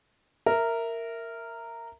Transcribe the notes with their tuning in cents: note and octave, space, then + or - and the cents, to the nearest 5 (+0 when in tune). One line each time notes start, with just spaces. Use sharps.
A#4 -10 E5 +0